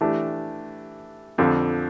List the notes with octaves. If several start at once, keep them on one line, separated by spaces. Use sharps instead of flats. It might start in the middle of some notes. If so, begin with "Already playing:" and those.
E3 A3 D4 G4
F2 D3 F3